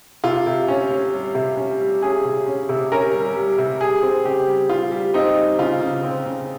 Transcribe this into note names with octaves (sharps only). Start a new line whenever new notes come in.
C3 F4
C3
C#4
C#4
G3
C3
C#4
G3
C#4 G#4
C3
C#4
C3
C#4 A#4
G3
G3
C3
G3 G#4
C4
C#3 G4
G3
G3 F4
G3
C4 D#4
G3
C#3 F4
C#3
C4
C#3